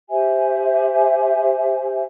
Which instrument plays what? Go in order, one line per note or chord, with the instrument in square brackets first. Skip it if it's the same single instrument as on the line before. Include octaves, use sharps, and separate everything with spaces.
[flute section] G4 C5 E5 G#5